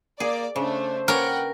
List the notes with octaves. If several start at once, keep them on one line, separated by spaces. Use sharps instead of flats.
A#3 G#4 D5
C#3 A3 D4 C5
A#3 C#4 A#4 B4 C#5 F#5 G5